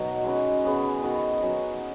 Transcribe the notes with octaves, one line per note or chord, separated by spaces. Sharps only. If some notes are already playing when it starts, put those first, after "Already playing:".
Already playing: B2 F#3 B3 D#4 F#4
G#3 C#4 B4
C#3 B3 G#4 C#5
D#3 B3 F#4
F#3 C#4 F#4